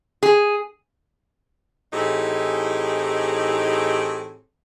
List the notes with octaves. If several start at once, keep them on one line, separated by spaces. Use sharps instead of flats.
G#4
A2 E3 C4 D#4 G4 G#4